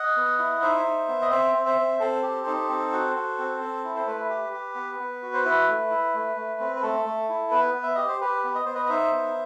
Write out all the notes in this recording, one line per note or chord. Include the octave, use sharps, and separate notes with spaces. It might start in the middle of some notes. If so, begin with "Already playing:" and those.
Already playing: D#5 F#5
B3
E4
D#4 C5 E5
D#4
B3
D#5
C4 C5 E5
C4
C5 E5
C4
C4 A4 C5
G4
D#4
C4
F#4
F#4
C4
C4
E4
C5
A3 B4
G4
G4
B3
B3
F#4
C5
E4 B4
A3
E4
A3
A3
C4
B4
A3 A4
A3
E4
B3 B4
B3
E5
G4 D#5
C5
G4 B4
B3
D#5
B3 C5
B4 D#5
D#5
D#4 C5 E5
B3